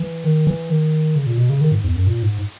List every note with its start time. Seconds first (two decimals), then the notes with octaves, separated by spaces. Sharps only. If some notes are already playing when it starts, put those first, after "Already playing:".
Already playing: E3
0.24 D#3
0.47 E3
0.70 D#3
1.16 C#3
1.26 A#2
1.38 B2
1.50 C#3
1.61 D#3
1.72 G#2
1.84 E2
1.95 F#2
2.07 A#2
2.22 G#2